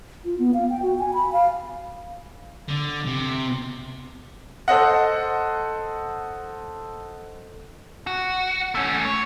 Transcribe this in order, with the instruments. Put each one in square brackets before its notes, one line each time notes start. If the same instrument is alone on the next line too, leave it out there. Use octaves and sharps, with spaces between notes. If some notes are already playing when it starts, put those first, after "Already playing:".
[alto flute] F4
B3
F5
G5
F#4
G#5
B5
F5
[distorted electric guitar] D3
C3
[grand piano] A4 C5 D#5 F#5
[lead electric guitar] F#4
A3 C#4
C#5